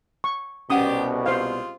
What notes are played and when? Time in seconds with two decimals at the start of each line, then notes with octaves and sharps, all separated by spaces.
0.24 C#6
0.70 C2 B2 B3 C#4 D4 G4 F#5 D#6
1.26 C3 G#3 F4 C5 F5